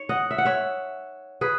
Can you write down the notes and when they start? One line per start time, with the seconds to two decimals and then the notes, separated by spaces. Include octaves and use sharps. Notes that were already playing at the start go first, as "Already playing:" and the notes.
Already playing: D#4 C#5
0.09 D#5 F#5
0.31 E5
0.38 F#5
0.45 C#5 E5
1.41 G#4 B4